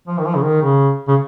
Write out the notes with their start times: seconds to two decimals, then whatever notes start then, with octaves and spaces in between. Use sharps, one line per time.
0.08 F3
0.19 D#3
0.26 F3
0.36 C#3
0.43 D#3
0.62 C#3
1.08 C#3